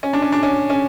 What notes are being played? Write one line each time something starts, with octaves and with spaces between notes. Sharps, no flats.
C#4
D4
C#4
D4
C#4
C#4